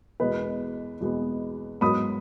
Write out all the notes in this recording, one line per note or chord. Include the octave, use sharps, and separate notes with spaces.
E2 B2 G#3 B3 B4 D#5
E2 B2 G#3 B3
G#2 F#3 B3 B5 D#6